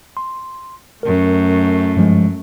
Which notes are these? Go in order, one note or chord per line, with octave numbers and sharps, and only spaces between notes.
C6
F#2 A3 A#4
G2 F3 G#3